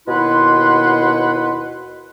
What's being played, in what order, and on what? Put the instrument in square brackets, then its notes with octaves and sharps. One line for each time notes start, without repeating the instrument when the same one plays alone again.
[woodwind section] D#2 B2 E4 B4 F#5 C6